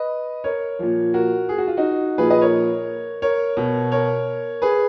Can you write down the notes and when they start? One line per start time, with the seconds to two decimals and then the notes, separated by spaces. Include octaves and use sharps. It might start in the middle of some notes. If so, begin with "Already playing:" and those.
Already playing: B4 D#5
0.44 A#4 C#5
0.79 A#2 F3
1.14 F#4 A#4
1.49 G#4
1.58 F#4
1.68 F4
1.77 D#4 F#4
2.18 A#2 F3 G#4 B4
2.30 B4 D#5
2.42 A#4 C#5
3.22 A#4 C#5
3.57 B2
3.92 A#4 C#5
4.62 G#4 B4